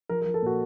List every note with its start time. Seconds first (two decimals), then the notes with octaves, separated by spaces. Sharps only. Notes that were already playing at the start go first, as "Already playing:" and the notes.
0.09 F3 A#4
0.22 F3 A#4
0.34 A4
0.42 A#2 F#4